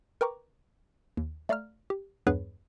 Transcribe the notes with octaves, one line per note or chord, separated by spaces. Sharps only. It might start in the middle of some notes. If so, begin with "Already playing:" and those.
A#4 B4 G5 A#5 C#6 D6
D#2
A3 D5 F5 A#5 F6
G4
E2 G2 B3 G#4 B4 C#5